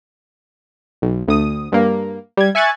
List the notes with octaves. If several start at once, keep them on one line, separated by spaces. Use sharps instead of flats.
B1
D2 D#6
G2 A#3
G3 G#6
E5 G#5 C#6 F#6 G#6 A6